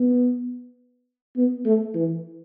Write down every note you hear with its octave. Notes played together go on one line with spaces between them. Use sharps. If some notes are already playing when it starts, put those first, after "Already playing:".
Already playing: B3
B3
A3
E3